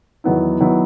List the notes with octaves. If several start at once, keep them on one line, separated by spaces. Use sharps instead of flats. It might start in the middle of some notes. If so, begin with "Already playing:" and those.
E2 D#3 F#3 B3 E4
D#3 F#3 B3 E4